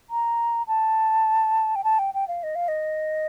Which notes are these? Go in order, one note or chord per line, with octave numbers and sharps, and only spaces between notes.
A#5
A5
G5
A5
G5
G5
F5
D#5
F5
D#5